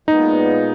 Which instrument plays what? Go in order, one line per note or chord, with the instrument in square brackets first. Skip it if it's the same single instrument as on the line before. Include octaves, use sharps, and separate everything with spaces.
[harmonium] A#2 G#3 B3 [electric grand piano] D#4